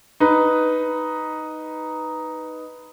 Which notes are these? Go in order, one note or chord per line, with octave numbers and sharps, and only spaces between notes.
D#4 B4